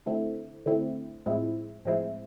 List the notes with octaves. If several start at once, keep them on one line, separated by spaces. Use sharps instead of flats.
D3 A3 C4 E4
D3 A3 C4 E4
A2 F3 G#3 C4 E4
A2 F3 G#3 C4 E4